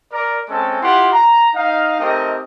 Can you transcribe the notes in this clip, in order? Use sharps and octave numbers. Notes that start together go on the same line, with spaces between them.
A#4 D5
G#3 C4 C#4 A4
E4 F4 G4 F#5 C6
A#5
D#4 F5
A3 C4 D#4 G4 A#4 D#5